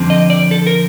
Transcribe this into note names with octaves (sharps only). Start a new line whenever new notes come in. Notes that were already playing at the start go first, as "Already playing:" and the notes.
Already playing: F2 D3 F3 C4
D#5
D5
A4
A#4